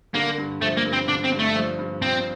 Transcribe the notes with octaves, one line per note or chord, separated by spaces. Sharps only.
D3 A#3
G2
F3 A3
A#3
G2
C4
D3 D4
C4
G2
A3
F3
G2
F3 C4